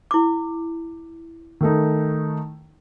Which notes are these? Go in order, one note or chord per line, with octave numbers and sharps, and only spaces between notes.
E4 D6
D#3 A3 D#4